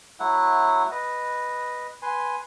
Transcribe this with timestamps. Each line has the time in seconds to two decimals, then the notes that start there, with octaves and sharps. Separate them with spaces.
0.20 F#3 A3 E4 F#5
0.91 B4 D#5
2.02 B4 G#5 C6